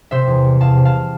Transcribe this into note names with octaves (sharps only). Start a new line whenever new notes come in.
C3 C5 E5
E2
G3
E2 F5 A5
C3
F5 A5